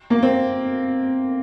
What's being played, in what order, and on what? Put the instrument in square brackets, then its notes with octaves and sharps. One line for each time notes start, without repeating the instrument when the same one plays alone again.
[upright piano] A#3
C4